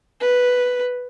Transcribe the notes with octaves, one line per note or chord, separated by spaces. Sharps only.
B4